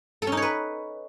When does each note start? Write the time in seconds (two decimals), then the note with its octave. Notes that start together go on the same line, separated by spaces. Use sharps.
0.22 A4
0.27 C#4
0.32 D#4
0.37 C#5
0.42 B4